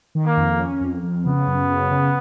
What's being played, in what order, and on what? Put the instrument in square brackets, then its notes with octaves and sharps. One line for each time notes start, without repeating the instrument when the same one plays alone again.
[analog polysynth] D#3
[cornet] A#3
[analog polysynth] F2
C#4
F2
F2
[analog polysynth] C#3 [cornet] B3
[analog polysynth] F#2
C#3
C#3